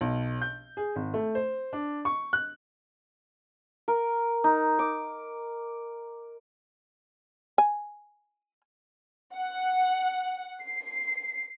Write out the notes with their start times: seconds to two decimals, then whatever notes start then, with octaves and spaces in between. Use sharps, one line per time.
0.01 B1
0.42 G6
0.77 G#4
0.96 G#1
1.14 A3
1.35 C5
1.73 D4
2.05 C#6
2.33 F#6
3.88 A#4
4.44 D#4
4.79 D6
7.58 G#5
9.34 F#5
10.63 C7